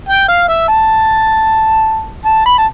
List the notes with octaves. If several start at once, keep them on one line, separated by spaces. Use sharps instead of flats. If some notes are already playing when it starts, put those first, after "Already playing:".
G5
F5
E5
A5
A5
B5
A5